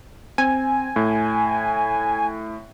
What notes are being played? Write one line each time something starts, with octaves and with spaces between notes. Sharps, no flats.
C4 G#5
A2